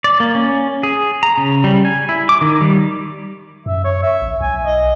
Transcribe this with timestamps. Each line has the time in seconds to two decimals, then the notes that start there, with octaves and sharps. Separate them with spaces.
0.04 D5
0.20 A#3
0.35 C#4
0.83 G#4
1.23 A#5
1.38 C#3
1.64 G3
1.85 G#5
2.09 E4
2.29 D6
2.41 D#3
2.61 G3
3.66 F#2 E5
3.84 C#5
4.03 E5
4.22 A1
4.41 B1 G#5
4.65 D#5